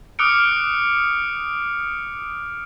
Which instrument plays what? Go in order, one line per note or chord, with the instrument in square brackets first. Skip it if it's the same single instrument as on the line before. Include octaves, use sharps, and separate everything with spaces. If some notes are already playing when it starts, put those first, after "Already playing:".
[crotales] D6 D#6 F6 F#6 C#7 D7